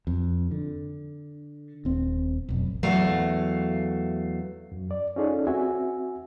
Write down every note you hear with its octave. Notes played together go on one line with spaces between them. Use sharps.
F2
D3
D#1 C4
F1 B1
E2 F#3 A3 F5
F#2
D5
C#4 D#4 F4 G#4 A4 D5
C4 F#4 E5 G#5